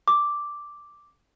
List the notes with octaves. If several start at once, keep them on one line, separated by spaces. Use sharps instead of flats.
D6